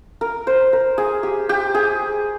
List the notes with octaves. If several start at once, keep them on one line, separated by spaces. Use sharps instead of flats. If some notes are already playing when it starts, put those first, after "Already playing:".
A#4
C5
A#4
G#4
G4
G4
G#4